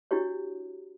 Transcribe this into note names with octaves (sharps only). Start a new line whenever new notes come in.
D4 E4 F#4 G4 C#5